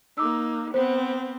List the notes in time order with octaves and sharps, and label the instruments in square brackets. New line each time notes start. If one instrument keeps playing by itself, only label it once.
[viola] A#3 D#4 [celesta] D6 E6
[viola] B3 C4 [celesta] C5